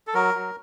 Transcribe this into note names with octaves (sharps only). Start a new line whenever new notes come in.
A4
F#3 A#4
F#3